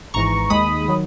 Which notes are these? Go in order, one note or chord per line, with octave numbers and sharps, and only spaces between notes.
G#1 G#2 E3 A#5 C#6
D#2 D#3 G#3 B5 D#6
D#3 F#3